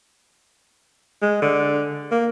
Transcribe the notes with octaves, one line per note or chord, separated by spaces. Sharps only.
G#3
D3
A#3